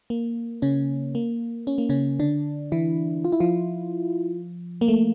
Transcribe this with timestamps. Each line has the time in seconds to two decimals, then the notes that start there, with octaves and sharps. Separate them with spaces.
0.10 A#3
0.62 C#3 C#4
1.15 A#3
1.67 C#4
1.78 A#3
1.89 C#3 C#4
2.19 D3 D4
2.72 E3 E4
3.25 F4
3.32 E4
3.40 F3 F4
4.81 A#3
4.88 A3